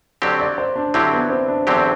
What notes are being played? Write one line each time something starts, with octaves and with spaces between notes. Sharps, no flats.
D3 F#3 C4 G4 D5
D5
C5
D4
D3 F#3 C4 E4 G4
B3
C4
D4
E2 D3 F#3 C4 G4